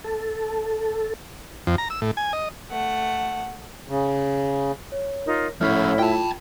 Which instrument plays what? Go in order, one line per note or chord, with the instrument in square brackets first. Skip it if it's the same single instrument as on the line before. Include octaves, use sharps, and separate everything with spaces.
[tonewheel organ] A4
[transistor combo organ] F2
A#5
E6
A2
G#5
D#5
[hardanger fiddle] A3 F#5
[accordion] C#3
[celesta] C#5
[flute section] D#4 F4 A#4
[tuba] A2 [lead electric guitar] F3 C#4 [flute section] E4 E5 [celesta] F6
[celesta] F4 [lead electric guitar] G5 A5